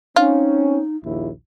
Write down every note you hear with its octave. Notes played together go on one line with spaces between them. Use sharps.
C4 C#4 D#4 F4
A#1 D#2 E4